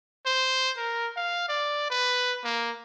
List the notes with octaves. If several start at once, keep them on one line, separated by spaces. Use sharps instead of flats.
C5
A#4
F5
D5
B4
A#3